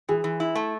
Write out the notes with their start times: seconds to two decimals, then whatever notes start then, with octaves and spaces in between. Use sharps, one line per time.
0.09 E3 G#4
0.24 E3
0.40 E4
0.55 A3